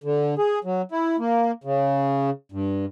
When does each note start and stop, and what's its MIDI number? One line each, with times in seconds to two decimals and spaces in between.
0.04 0.34 50
0.38 0.59 68
0.64 0.82 54
0.92 1.16 64
1.19 1.51 58
1.64 2.30 49
2.52 2.85 43